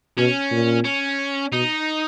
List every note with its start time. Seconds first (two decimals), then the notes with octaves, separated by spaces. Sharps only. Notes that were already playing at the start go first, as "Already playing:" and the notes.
0.18 B2 C#4
0.51 A#2
0.85 C#4
1.52 B2 D#4